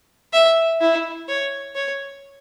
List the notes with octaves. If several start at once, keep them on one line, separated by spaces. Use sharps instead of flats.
E5
E4
C#5
C#5